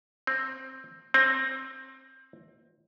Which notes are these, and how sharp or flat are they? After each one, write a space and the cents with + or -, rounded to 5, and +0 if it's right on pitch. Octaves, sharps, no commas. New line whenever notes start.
C4 +15
C4 +20